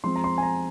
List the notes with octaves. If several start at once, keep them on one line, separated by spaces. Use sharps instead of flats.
F3 G#3 C4 C6
A#5
C6
G#5
A#5